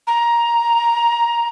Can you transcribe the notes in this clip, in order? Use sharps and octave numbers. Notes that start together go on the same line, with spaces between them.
A#5